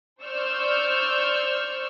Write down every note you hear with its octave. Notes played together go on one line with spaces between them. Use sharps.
C5 D5 C#6 E6 F6 G6